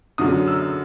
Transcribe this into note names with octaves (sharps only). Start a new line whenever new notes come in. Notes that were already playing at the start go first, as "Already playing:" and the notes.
F#2 D3 F#3 D#6
E6